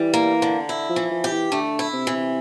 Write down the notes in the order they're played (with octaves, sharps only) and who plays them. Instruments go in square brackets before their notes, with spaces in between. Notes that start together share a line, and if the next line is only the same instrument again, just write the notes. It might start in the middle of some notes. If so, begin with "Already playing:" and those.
Already playing: [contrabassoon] E3 [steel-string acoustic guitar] G3
[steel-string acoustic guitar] A#3
D3
E4
[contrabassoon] F3
[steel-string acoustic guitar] E3
[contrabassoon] F3
[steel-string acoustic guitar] G4
[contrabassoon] E3
[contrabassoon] D3 [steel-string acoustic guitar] A3
[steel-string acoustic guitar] E4
[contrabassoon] C3
[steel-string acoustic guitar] E3